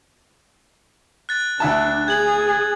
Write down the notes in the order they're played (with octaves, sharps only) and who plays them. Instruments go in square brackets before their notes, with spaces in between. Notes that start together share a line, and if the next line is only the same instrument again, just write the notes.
[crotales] F#6 A6
[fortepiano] D2 E5 A5 [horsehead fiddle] D4
[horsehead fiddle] G#4 [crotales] G#6 F#7